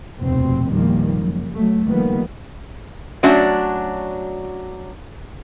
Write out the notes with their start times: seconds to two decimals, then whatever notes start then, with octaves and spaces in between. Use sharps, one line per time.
0.19 F1 D#2 B2 C4
0.68 E2 A#2 D#3 F3 G3 A#3
1.17 F#1 F#2
1.53 F#3 A3
1.85 D#3 F3 G3 A#3 B3
3.23 F#3 A3 C#4 D4 F#4 D5